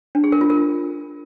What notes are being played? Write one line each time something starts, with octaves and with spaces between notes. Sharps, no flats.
D4
G#4
A#4
F4
A#4